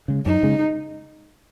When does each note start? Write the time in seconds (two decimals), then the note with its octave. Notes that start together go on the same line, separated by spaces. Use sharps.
0.08 C#3 G#3
0.26 F#2 D#4
0.43 C#3 G#3